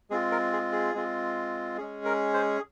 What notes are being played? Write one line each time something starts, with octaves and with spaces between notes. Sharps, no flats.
G#3 C4 F4 G#4
A#4
G#4
G#4
G#3 C4 F4
G#3 C#4 G#4
A#4
C5